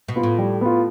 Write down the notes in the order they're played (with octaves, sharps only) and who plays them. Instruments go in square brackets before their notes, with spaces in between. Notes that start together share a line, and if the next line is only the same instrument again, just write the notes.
[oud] B2
[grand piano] B3 F4
[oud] A2
[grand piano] G3
B3 F4